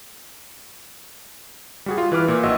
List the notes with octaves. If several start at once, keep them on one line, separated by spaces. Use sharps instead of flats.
G3 F#4 G#4
F4
E3 B4 D6 F6
A#2
A#1 F#4 D#5 E6